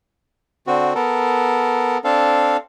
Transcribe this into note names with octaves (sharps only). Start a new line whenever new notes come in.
D3 C4 F#4
B3 A4 A#4
C4 D4 A4 F5